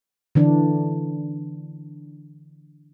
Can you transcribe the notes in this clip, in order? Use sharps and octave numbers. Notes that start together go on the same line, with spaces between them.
D3 E3 D4